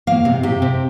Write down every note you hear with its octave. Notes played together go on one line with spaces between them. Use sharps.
A#3 F5
C3
C3 G4
C3